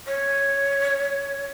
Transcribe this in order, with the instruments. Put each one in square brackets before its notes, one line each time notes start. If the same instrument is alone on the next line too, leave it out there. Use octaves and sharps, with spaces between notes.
[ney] C#5